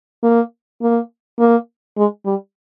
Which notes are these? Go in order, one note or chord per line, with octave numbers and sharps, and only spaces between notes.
A#3
A#3
A#3
G#3
G3